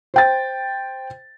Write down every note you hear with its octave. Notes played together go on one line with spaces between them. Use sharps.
C5 G5 A6